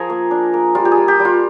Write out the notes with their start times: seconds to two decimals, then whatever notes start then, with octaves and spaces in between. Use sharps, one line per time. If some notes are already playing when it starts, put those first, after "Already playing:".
Already playing: F3 G#4 A#4
0.10 A#3
0.31 D4
0.54 A#3
0.75 G3 F4
0.85 G4
0.91 G#4
0.97 G3
1.08 G4
1.20 G3
1.25 F4